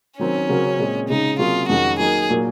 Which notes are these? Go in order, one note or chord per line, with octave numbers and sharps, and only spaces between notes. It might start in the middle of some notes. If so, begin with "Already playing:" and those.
D#3 F#3 C4 C#4
C#3 F#3 C4 F#4 A#4
A#2 G#3 C4
C#3 G#3 C#4 D#4
C3 F#3 A#3 C#4 F4 G#4
F2 D#3 G#3 C#4 F#4
F#3 A#3 D#4 G#4 A#4
A#2 F#3 A#3